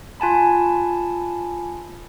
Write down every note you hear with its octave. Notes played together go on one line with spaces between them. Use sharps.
F4 G#5 A5 B5